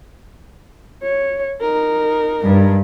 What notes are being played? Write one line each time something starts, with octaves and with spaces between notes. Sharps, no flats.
C#5
D#4 A#4
G2